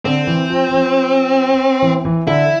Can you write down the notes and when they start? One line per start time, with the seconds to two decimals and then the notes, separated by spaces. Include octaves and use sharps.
0.05 D3 C4
0.27 E3
0.50 F3
0.71 F3
1.82 E3
2.05 E3
2.27 D3 E4